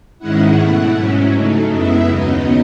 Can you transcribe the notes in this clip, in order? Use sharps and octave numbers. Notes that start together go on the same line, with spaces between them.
G#2 D#3 G#3 C#4 E4 F#5
B2 A3 E4 F#5
G#2 F#3 C#4 E4
C#3 F#3 A3 D#4
F#2 C#3 G#3 B3 E4 E5
D#2 C#3 F#3 B3 D#4 D#5